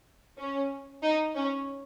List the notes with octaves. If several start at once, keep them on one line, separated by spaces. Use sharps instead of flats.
C#4
D#4
C#4